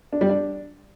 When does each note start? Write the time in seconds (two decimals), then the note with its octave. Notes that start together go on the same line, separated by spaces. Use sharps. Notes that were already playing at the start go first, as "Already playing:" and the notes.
0.13 D4
0.21 G3
0.29 D4